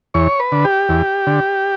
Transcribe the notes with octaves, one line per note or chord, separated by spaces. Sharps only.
E2 C#5
B4
D3
G4
E2
D3